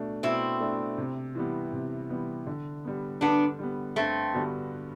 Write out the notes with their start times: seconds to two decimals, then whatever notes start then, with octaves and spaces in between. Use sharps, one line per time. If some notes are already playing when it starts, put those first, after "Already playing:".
Already playing: B2 A3 D4
0.23 B2 C4 E4
0.60 A3 D4
0.98 C3
1.35 E3 G3 B3
1.72 C3
2.10 E3 G3 B3
2.47 D3
2.84 G3 B3
3.21 D3 B3 D4
3.59 G3 B3
3.96 G2 A3 C4
4.34 D3 G3 B3 F#4